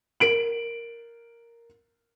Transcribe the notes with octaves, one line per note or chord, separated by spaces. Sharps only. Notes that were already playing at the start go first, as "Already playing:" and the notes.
A#4 D7 F#7